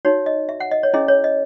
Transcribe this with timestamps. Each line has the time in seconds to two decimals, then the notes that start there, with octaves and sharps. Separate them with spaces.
0.05 D#4 F#4 C#5
0.26 D#5
0.49 E5
0.60 F#5
0.71 D#5
0.83 C#5
0.94 C#4 E4 G#4 D#5
1.08 C#5
1.24 D#5